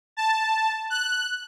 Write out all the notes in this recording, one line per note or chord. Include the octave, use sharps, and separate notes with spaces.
A5
F#6